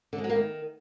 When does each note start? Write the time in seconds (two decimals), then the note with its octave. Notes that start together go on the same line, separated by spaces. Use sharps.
0.13 D3
0.18 G#3
0.24 F#3
0.30 A#3
0.35 D#3